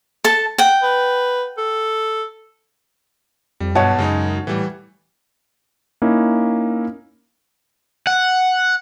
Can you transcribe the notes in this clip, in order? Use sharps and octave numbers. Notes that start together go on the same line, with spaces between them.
A4 A5
F#5 G5
B4
A4
F2 G3
B1 G2 B2 C#5 F#5 A5
F#2 C#3 G#3 D#4
A2 E3 G3
A#3 C#4 D#4 E4
F#5